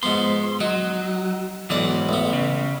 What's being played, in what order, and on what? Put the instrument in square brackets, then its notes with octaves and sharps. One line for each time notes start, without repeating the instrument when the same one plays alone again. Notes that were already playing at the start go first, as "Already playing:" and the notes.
[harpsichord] G#2 F3 B3 [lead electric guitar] C6
[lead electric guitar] F#3 [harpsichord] D#4
[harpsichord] B1 D5 F#5 [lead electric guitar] G#2 E3
[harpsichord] A1 B3
[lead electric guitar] C#3